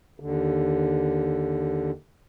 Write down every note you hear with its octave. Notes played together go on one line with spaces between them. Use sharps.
D#2 D3